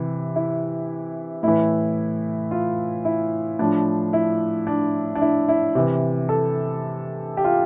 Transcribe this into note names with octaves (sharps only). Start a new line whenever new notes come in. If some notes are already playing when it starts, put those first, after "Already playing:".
Already playing: C3 E3
E4
A2 E3 E4
F4
E4
A2 F3 D4
E4
D4
D4
E4
E4
C3 E3
A4
G4
F4